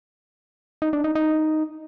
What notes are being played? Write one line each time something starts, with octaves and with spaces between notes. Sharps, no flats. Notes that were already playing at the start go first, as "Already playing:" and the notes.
D#4
D4
D#4
D#4